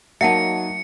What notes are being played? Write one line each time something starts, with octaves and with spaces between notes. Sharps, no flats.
F#3 A#3 D#4 E5 F#5 A5 C#7